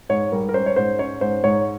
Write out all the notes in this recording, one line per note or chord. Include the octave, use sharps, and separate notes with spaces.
G#2 C#5
G3 A#4
A#4
C#4 C5
C#5
G#2 C5
C#4 C#5
G#2 C5
G#2 C#5